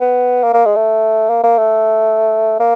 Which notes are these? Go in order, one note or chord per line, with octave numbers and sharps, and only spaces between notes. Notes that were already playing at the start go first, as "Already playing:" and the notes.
B3
A#3
A#3
G#3
A3
A#3
A#3
A3
A#3